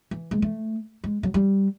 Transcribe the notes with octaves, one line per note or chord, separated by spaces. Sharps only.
E3
G#3
A3
G#3
F#3
G3